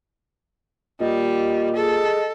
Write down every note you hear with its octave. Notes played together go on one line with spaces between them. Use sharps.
A#2 G3 D#5
G#4 A4